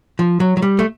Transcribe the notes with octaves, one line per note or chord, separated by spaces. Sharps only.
F3
F#3
F#3
G3
A3